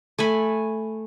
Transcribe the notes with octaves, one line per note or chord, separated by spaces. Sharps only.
A3 G#5 B5